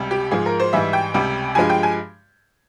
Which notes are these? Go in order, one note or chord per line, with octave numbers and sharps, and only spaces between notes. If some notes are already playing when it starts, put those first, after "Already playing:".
Already playing: C#2 C3 G3
G4
G#2 F3 G#3 G#4
A#4
C5
G#2 E3 G3 E5
G5
C#2 C3 G3
G2 F3 G#3 G#5
G5
G#5